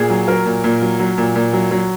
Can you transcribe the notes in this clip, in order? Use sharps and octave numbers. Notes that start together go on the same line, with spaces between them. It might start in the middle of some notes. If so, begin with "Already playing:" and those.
Already playing: A#2 G#4
F#3
F#3 A#4
A#2
A#2
F#3
F#3
A#2
A#2
F#3
F#3